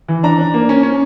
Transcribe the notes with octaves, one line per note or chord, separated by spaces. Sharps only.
E3
D4 A#5
D4
A#3
C#4
C#4